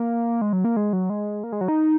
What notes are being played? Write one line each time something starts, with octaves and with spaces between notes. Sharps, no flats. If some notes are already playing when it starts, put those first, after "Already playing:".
Already playing: A#3
G#3
F#3
A#3
G#3
F#3
G#3
A#3
G#3
F#3
D#4